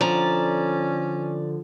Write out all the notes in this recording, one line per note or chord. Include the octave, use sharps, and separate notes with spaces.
D3 F3 C#4 D5 A#5